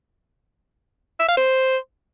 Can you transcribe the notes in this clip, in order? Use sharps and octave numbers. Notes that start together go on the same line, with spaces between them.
E5
F5
C5